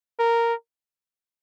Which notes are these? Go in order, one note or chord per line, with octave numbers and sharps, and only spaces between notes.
A#4